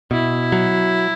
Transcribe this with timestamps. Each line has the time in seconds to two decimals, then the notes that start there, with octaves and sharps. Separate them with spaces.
0.11 B2 E4
0.52 F#3